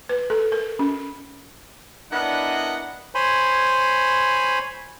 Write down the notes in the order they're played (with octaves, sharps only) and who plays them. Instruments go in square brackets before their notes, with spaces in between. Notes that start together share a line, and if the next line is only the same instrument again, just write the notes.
[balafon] B4
A4
A#4
C#4
[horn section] B3 D4 E4 A#4 D#5 F#5
[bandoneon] C5 C#5 G#5 B5 C6